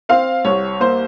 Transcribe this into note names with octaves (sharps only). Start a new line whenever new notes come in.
C4 F5
C2 C#5
A#3 C5